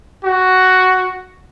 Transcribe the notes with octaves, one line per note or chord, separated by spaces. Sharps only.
F#4